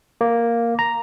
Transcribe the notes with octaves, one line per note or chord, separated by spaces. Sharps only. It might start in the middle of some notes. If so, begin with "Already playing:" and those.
A#3
A#5